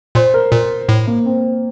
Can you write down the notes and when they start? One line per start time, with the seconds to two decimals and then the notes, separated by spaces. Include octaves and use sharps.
0.15 A#2 C5
0.34 A#4
0.52 A#2 A#4
0.89 A2
1.07 A#3
1.26 C4